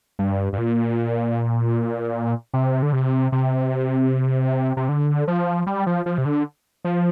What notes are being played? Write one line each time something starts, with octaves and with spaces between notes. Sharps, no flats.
G2
G2
A#2
C3
D3
C3
C3
C3
D3
F3
G3
F3
F3
C3
D3
F3